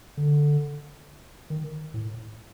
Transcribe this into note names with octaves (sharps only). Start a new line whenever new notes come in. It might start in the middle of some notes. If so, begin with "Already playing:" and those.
D3
D#3
A2